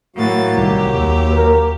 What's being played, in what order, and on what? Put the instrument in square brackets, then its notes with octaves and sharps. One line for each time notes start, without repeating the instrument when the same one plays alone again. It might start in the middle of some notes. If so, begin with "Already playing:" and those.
[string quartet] A2 E3 A6 [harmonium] F#3 A#3 F#4
[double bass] C2 D#3 [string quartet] G4
[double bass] D#2
[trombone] A#4